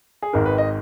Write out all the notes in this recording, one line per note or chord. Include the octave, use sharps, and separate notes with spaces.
G#4
G#1 G#2 D#3 A#4
B4
D#5